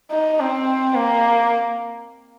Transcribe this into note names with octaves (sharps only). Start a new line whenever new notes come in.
D#4
C4
A#3